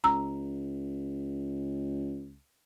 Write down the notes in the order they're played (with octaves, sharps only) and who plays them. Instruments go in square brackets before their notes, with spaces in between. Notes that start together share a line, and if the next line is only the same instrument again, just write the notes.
[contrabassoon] C#2 [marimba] A#5 E6